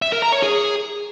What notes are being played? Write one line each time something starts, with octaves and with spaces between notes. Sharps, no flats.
E5
A#4
A#5
C#5
G#4